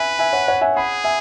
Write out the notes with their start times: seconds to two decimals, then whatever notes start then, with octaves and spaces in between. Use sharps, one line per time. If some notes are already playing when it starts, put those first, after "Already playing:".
Already playing: B4 E5 G#5
0.19 E5 G#5
0.33 C#5 F#5
0.48 C#5 F#5
0.61 E5 G#5
0.76 G#4 F#5 B5
1.04 E5 G#5